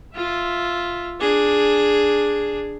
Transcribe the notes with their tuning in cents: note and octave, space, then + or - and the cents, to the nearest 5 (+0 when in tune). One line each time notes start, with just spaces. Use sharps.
F4 +0 E5 +0
D4 +0 G#4 +0